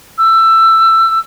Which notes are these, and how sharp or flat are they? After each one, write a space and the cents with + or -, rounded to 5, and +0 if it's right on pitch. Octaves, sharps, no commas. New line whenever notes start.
E6 +15